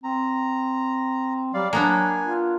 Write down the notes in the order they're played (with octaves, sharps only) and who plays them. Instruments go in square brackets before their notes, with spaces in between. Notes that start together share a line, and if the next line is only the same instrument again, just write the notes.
[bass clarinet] C4 [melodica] A#5
[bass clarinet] F#3 [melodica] G3 D5 F5
[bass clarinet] F#3 [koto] A#3 B3 D4 [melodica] G#5
[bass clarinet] F4